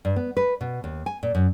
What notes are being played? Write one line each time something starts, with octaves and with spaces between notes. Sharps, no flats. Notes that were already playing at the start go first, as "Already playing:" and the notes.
G2
B3
B4
B2
D#2
G#5
A#2
F#2